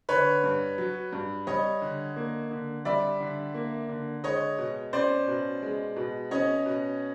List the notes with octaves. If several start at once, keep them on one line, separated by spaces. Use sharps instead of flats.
D3 B4 C#5
G2
F#3
G2
G3 C#5 D#5
D3
A#3
D3
G3 D5 E5
D3
A#3
D3
G#3 C#5 D#5
B2
C#4 C5 D5
B2
G#3
B2
C#4 C#5 D#5
B2